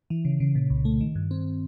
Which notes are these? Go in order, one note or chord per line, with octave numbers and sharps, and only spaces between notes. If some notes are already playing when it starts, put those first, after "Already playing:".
E3
C#3
C#3
A#2
C2
A3
D#3
G2
C4